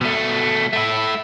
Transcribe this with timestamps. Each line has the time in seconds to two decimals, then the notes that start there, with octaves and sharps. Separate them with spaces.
0.01 B2 A3
0.73 A3 E4